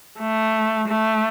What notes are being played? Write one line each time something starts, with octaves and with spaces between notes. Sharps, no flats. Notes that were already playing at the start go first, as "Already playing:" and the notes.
A3
A3